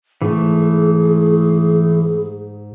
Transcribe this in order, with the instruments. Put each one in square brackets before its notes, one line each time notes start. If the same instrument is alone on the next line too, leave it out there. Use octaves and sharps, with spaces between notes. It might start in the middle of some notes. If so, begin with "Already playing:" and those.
[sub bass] G#2 [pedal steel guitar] E3 A3 [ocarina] G#4